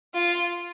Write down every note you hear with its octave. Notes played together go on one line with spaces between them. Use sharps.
F4